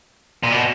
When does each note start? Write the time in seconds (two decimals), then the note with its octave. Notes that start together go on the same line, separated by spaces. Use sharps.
0.43 A#2
0.52 B2